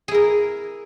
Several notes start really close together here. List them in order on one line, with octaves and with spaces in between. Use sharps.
G#4 E4 A#4